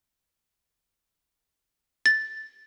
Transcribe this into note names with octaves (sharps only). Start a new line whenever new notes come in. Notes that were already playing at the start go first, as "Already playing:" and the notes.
A6